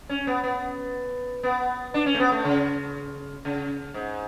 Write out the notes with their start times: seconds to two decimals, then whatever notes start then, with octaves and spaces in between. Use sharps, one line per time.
0.09 C#4
0.27 B3
0.43 B3
1.43 B3
1.94 D4
2.06 C#4
2.14 A3
2.20 B3
2.32 A3
2.45 C#3
3.45 C#3
3.94 G#2